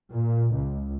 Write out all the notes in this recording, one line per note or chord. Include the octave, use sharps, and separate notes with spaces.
A#2
C#2